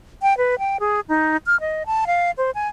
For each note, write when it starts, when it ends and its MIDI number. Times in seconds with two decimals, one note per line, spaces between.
0.22 0.37 79
0.38 0.58 71
0.59 0.77 79
0.80 1.00 68
1.09 1.37 63
1.46 1.59 89
1.60 1.83 75
1.86 2.05 81
2.07 2.31 77
2.37 2.51 72
2.55 2.68 80